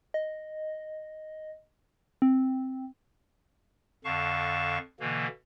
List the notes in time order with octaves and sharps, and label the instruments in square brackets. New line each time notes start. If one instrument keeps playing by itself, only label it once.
[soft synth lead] D#5
C4
[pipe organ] F2 D3 F5 A5 C#6
B2 D3 E3 A#3